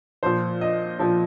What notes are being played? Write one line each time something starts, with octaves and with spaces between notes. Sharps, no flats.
A#2 F3 C5
D#5
A#2 F3